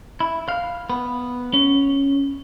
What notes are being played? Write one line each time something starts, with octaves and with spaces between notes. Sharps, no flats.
E4
F5
B3
C#4